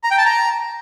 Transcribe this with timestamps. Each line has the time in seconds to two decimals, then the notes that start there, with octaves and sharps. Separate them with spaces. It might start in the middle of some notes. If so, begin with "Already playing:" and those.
0.03 A#5
0.11 G5
0.18 A5
0.25 A#5